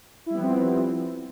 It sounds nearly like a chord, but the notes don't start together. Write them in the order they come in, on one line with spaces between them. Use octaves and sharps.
E4 G3 B3 F3 C4